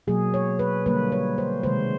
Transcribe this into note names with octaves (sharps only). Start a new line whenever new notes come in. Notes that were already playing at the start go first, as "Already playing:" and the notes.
B2 F#3 A#3 G#4
C#5
B4
D3 G3 A#3 B4
C#5
C5
C3 D#3 G#3 C5